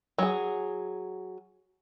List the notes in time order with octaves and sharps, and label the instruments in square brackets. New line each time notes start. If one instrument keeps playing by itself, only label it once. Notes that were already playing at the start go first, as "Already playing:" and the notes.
[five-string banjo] F#3 G#4